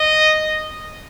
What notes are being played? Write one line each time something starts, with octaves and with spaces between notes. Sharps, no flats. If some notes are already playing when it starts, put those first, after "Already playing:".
Already playing: D#5